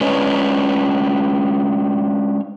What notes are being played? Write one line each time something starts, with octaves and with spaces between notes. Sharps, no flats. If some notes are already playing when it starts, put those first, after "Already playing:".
G#3 C#4 D4 B4 C#5 D#5